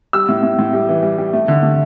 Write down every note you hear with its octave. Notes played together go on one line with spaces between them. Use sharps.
G3 E6
A2
A2
A2
G3
E3
G3
G3
A3
D3
A3